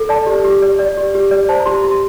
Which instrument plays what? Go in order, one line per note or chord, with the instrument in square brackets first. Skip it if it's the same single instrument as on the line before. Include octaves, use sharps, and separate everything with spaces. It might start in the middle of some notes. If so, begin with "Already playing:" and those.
Already playing: [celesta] A4
D5 A5
G4
G4
D5
D5
G4
G4
D5
C5 A5
A#5
G4 C6
G4 C6